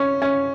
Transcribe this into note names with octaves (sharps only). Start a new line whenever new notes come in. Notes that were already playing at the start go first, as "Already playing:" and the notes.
Already playing: C#4
C#4